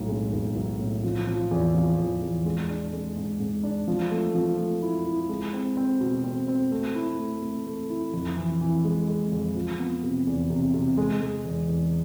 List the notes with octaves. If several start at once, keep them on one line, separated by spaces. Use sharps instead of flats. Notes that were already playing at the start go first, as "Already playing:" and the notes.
Already playing: B1 A2
G#3
B1
B1
A2
F3
F3
E2
F3
E2
E2
G#3
D4
G#3
G#2
G#2
D4
F3
A3
F3
A3
E4
E4
G#3
C4
C4
B2
C4
C4
A3
E4
A3
A3
A3
E4
F2
E3
E3
G#3
G#3
F2
F3
B3
C3
E2
C3
C3
G#3
G#3
E2
E2